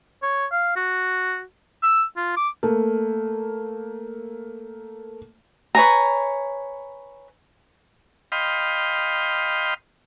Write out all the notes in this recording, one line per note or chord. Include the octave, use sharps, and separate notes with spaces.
C#5
F5
F#4
E6
F4
D6
A3 A#3
B4 C#5 G#5 A#5
D#5 F5 G5 B5 C6